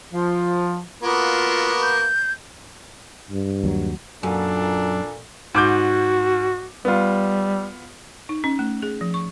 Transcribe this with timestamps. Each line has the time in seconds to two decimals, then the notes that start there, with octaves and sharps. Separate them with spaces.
0.13 F3
1.03 A#3 B3 F4 F#4
1.81 G6
3.31 G2
3.64 D#2 F#3
4.23 F#2 A#2 D4 A4
5.55 G#2 F#4 D6 G6
6.85 G3 B3 F4
8.29 D#4
8.44 C#4
8.59 A3
8.83 G#4
9.01 F3
9.14 C#6